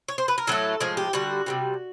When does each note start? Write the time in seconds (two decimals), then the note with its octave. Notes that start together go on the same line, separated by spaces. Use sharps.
0.08 C#5
0.18 C5
0.28 B4
0.38 A#4
0.47 A2 F#3 A3 A4
0.80 A2 F3 G#3 G#4
0.97 G4
1.13 D3 G3 F#4
1.46 C3 E3 G3